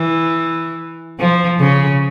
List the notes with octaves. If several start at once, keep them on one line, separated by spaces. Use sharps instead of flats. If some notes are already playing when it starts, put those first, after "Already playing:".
Already playing: E3
F3
C#3